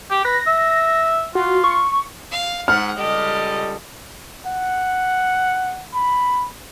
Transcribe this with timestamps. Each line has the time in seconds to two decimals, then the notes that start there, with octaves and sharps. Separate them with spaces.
0.11 G4
0.25 B4 A#6
0.47 E5
1.35 F4 F#4
1.64 C#6
2.31 F5
2.68 G#2 F#5 F6
2.97 C#2 G3 G4 A4 D#5
4.46 F#5
5.93 B5